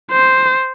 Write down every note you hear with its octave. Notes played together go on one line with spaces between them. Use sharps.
C5